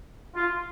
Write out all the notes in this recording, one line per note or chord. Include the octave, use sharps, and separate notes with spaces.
F4